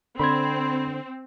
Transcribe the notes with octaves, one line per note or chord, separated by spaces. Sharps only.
D3 C4 B5 C6 G#6